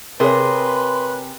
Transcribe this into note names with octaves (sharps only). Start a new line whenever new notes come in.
C3 G#4 A#4 B4 C#5 C6